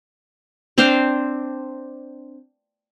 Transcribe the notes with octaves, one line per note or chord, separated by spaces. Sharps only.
C4 D4 C5 F5